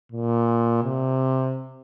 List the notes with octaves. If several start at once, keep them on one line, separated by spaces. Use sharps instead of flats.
A#2
C3